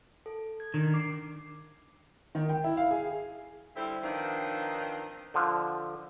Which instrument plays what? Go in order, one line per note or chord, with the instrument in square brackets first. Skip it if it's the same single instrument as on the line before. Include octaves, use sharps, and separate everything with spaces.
[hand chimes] A4
G#6
[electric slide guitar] D#3 [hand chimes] D4
[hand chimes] D6 C7
[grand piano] D#3
G5
E4
F5
G#4
[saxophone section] D3 G3 C4 E4
D#3 F3 B3 C4 D4 D#4
[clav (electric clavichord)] D3 F3